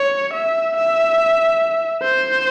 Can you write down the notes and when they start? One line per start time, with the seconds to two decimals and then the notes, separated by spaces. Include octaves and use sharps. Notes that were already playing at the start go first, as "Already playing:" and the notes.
Already playing: C#5
0.34 E5
0.76 E5
2.02 C5